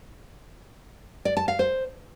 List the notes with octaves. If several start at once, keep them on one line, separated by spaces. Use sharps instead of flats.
D5
A5
F5
C5